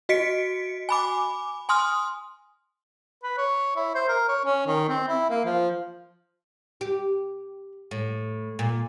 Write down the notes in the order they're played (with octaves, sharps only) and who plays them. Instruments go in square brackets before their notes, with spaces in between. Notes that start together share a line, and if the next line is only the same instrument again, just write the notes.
[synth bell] F#4 D#5 B6 C#7 D7
G#5 B5 D6
G#5 C6 D#6 F6
[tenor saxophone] B4
C#5
E4
C5
A#4
C#5
C#4
D#3
C4
E4
A#3
F3
[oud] G4
A2
A#2